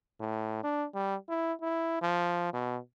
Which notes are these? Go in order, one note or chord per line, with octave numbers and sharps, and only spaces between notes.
A2
D4
G3
E4
E4
F3
B2